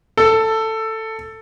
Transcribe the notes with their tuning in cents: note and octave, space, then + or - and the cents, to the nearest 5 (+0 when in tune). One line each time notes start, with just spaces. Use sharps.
A4 +10